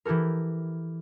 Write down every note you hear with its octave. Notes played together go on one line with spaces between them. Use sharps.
E3 E4 G4 A4 A#4